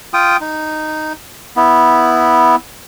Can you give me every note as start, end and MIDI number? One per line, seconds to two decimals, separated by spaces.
0.14 0.37 65
0.14 0.37 79
0.14 0.37 87
0.41 1.13 63
1.56 2.56 59
1.56 2.56 64